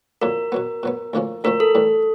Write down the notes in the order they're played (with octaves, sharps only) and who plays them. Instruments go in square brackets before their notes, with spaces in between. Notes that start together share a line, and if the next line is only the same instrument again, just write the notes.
[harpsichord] F2 D3 F#3 A#3 D4 [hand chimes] A#4
[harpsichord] B2 F#3 B3
B2 F#3 B3
D2 D3 F3 A#3 C#4
[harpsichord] D2 D3 F3 A#3 C#4 [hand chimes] A#4
[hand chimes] A4
[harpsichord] A2 E3 G3